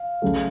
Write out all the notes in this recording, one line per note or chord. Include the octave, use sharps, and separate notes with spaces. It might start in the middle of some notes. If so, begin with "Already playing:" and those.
Already playing: F5
C#3 F#3 A3